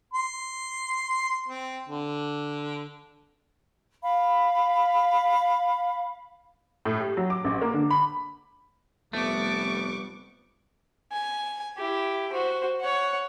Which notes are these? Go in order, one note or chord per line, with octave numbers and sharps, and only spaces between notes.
C6
C4
D3
F5 B5
A2
G4
F#3
D6
A1
A#3
D3
B5
F1 G3 A3 B3 C#6 D6
G#5
E4 G4
F#4 C5
C#5 F#5